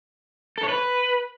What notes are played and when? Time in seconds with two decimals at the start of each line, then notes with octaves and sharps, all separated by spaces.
0.58 A4
0.63 C#5
0.69 B4